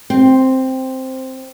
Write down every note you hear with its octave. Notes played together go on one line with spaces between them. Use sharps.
C4